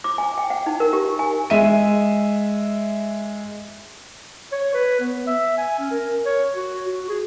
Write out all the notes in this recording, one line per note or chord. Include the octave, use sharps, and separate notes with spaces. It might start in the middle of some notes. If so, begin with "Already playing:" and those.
D6
G#5
G5
F#5
D#4
A#4
G4
G#5
G#3 E5 D#7
C#5
B4
B3
E5
G#5
C#4
A#4
C#5
F#4
F#4
G#4